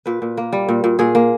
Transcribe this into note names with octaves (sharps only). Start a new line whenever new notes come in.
A#2 B4
A#2
A#3
G3
A#2
A#2
A#2 G#4
A#3